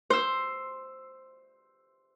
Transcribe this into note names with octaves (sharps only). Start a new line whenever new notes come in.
C5 E6